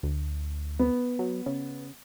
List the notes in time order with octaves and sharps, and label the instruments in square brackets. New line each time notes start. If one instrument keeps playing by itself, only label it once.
[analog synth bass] D2
[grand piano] B3
[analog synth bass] F#3
C#3